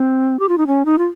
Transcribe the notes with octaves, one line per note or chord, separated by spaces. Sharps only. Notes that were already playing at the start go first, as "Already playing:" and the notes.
Already playing: C4
G4
F4
D#4
C#4
D#4
F4